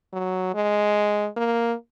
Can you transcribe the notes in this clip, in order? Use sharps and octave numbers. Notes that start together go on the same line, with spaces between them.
F#3
G#3
A#3